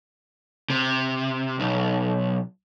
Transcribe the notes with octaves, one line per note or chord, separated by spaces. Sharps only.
C3
B1